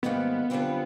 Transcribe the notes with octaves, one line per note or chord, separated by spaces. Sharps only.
G#2 D#3 G3 A#3 B3 C#4
F#2 D3 G3 C4 F4